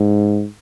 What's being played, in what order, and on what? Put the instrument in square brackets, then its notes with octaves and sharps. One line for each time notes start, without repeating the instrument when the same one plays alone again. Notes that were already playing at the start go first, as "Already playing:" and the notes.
Already playing: [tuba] G#2